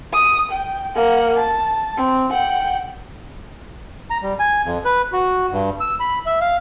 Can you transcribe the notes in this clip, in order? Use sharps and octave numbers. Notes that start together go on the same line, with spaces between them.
D#6
G5
A#3 F#5
A5
C4
F#5 G5
A#5
G3
G#5
F2
B4
F#4
G2
E6
B5
E5
F5